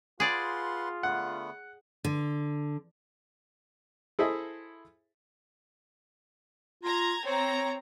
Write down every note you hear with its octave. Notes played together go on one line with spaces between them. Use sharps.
F4 G#4 B4 D5 F#5 C6
D3 A3 B3 F#5
D3
E4 G#4 A4 C5 D#5 E5
F4 A#5 G#6
C4 C#5 A#5